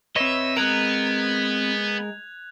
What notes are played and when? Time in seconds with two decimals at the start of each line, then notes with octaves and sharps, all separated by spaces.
0.16 C4 B4 C#5 D#5 E5
0.57 G#3 B3 A#4 F#6 G#6 F7